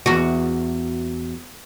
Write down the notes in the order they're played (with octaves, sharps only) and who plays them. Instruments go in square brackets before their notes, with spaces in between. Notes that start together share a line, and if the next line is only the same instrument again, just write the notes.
[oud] E2 F#4